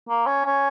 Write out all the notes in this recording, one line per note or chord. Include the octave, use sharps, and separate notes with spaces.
A#3
C#4
C#4